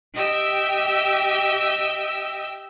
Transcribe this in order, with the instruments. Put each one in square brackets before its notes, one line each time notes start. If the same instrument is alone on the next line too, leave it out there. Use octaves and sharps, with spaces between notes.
[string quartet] G4 D#5 E5 G5 E6